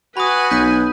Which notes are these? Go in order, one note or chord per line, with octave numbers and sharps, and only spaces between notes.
F#4 B4 G#5 B5 D#6
B1 G6 B6 D#7